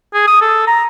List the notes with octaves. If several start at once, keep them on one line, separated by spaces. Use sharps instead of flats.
G#4
D#6
A4
A#5